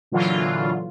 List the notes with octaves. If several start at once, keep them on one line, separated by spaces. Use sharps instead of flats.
A#2 D3 E3 F#3 F4